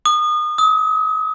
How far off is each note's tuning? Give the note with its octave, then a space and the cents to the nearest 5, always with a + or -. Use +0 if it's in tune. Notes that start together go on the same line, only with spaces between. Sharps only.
D#6 -30
D#6 +40